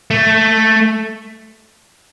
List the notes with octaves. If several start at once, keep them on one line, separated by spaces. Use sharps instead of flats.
A3